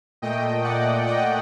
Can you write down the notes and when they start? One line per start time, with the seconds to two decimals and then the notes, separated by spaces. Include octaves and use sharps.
0.22 A#2 A3 D#5 G5
0.64 D5 F#5
1.06 D#5 G5